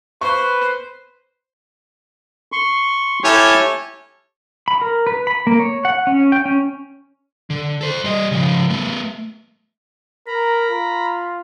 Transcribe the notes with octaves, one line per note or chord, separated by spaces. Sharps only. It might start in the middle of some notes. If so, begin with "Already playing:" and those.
B4 C5 C#6
C6 C#6
E4 G4 A4 C#5 G#5 F6
B5
A#4
B4
B5
A#3
C#5
F#5
C#4
G5
C#4
D3
A4 C5
G3 D#5
C#3 F3
A3 B3
A#4 A#5 B5
F4